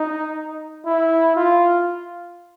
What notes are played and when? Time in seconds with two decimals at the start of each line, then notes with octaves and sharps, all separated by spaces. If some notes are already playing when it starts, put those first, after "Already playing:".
Already playing: D#4
0.86 E4
1.37 F4